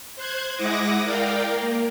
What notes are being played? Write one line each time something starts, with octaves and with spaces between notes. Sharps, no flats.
C5 F#6 G#6
G#3 E4 F#5 D6 D#6 A#6
A#4 D5 F5 G5
A#3